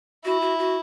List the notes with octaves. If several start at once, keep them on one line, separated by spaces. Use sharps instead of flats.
E4 F#4
F#4
F#4